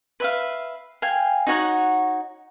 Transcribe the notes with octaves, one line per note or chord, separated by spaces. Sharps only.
B4 E5 F5
F5 G5 G#5
D#4 F#4 C#5 F#5